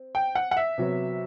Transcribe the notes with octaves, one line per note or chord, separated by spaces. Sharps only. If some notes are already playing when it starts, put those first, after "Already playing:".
Already playing: C4
G5
F#5
F#5
E5
C3 F#3 B3